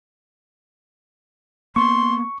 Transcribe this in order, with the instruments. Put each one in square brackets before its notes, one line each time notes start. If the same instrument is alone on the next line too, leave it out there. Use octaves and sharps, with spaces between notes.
[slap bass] A#3 B3 [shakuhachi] C6 [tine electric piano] C#6